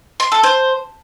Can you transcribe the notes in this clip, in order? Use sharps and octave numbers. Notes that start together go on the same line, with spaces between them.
C6
A4
C5